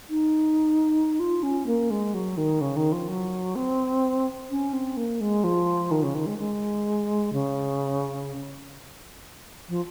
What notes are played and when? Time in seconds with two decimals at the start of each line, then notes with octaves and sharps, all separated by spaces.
0.09 D#4
1.19 F4
1.43 C#4
1.66 A#3
1.90 G#3
2.14 F#3
2.37 D#3
2.61 C#3
2.76 D#3
2.92 F3
3.08 F#3
3.55 C4
4.50 C#4
4.73 C4
4.97 A#3
5.20 G#3
5.44 F3
5.91 D#3
6.03 C#3
6.14 D#3
6.26 G#3
6.38 G#3
7.33 C#3
9.69 F3